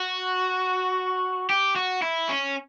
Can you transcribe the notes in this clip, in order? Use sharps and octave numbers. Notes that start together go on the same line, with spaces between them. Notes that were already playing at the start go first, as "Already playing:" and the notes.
Already playing: F#4
G4
F#4
E4
C#4